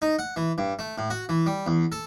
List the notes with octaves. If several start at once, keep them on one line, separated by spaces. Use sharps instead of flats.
D#4
F#5
E3
G2
A3
A2
F#4
E3
G3
E2
A4